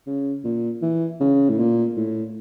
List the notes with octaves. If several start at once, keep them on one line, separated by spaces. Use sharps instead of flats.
C#3
A#2
E3
C#3
A2
A#2
A2